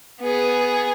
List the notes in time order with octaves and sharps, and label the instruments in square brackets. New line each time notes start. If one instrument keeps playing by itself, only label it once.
[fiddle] B3 G#4